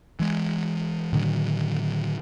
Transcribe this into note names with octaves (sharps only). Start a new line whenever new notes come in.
E3 G#3
A2 D3 D#3 F#3